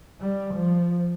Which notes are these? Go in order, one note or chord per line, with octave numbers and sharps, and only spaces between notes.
G3
F3